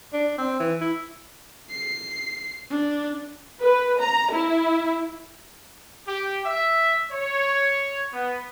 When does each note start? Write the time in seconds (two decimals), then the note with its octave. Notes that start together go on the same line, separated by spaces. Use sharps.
0.14 D4
0.38 C4
0.60 E3
0.81 E4
1.70 C7
2.70 D4
3.62 B4
4.01 A#5
4.34 E4
6.07 G4
6.45 E5
7.11 C#5
8.13 B3